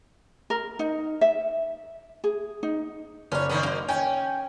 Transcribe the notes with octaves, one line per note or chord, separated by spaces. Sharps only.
A#4
D#4
E5
G#4
D#4
F#1 C#4 C#5 D5 F6
D#3 A#3 B3 C#4 G#4
F#2 A#3 C5 F7
C#4 G5 G#5